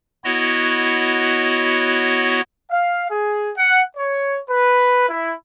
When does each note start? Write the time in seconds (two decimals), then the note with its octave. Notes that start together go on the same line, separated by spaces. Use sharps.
0.24 B3 E4 F#4 C#5 D#5
2.69 F5
3.09 G#4
3.56 F#5
3.97 C#5
4.48 B4
5.09 E4